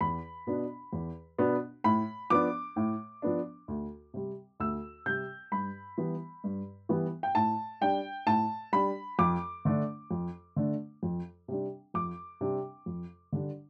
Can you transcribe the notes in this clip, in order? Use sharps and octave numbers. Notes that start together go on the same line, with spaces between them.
E2 B5
B2 B3 D4
E2
B2 B3 D4
A2 B5
F3 B3 D4 D6
A2
F3 B3 D4
D2
C3 G3
D2 E6
C3 G3 G6
G2 B5
E3 G3 B3
G2
E3 G3 B3
G5
A2 A5
G3 D4 G5
A2 A5
G3 D4 B5
F2 D6
D3 A3 D4
F2
D3 A3 D4
F2
C3 G3 D4
F2 D6
C3 G3 D4
F2
D3 G3 D4